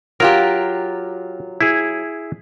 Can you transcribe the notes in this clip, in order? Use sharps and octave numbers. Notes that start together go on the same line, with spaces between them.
F#3 F4 G4 A#4
E4 G#4